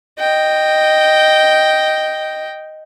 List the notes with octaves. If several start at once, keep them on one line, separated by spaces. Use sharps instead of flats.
D#5 G5